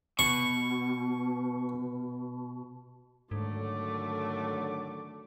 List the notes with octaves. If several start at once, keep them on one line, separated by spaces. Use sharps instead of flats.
B2 C#6
G#2 D3 D#3 F#3 A3 D6